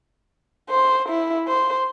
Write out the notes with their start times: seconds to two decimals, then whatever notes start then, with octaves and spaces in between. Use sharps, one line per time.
0.70 C5
1.09 E4
1.48 C5